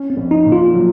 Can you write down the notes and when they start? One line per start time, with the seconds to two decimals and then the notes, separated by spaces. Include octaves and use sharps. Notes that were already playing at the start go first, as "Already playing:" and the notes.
Already playing: C#4
0.10 C4
0.17 A#1
0.31 D#4
0.45 A#2
0.52 F4
0.74 F#3